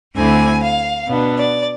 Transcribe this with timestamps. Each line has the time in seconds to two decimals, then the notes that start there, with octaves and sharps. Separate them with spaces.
0.15 D2 D3 A3 C4 E4 G#5
0.62 F5
1.07 B2 B3 D4
1.37 D5